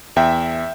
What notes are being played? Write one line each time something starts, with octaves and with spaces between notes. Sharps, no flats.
E2 E5 G5